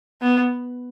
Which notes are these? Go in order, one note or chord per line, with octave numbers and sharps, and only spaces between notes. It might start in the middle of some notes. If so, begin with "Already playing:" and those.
B3